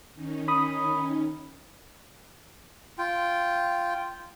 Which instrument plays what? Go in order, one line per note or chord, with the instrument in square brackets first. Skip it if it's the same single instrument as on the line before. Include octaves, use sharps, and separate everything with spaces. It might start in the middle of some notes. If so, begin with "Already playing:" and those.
[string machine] D#3 C#4 D#4
[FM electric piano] B5 D#6
[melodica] F4 G5